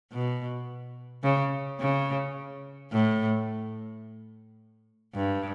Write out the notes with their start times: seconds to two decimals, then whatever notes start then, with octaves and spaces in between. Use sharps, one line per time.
0.12 B2
1.23 C#3
1.80 C#3
2.91 A2
5.14 G2